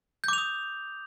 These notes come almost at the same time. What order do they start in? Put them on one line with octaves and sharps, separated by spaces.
G6 D6 F7 D#6